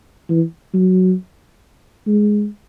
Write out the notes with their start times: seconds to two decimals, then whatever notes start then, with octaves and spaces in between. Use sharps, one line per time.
0.29 E3
0.74 F#3
2.06 G#3